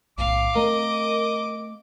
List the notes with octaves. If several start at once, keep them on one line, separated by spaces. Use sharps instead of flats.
B1 A2 F5 D6
A3 C4 A#4 D#5